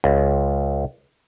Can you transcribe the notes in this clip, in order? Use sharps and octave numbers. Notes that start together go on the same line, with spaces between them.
C#2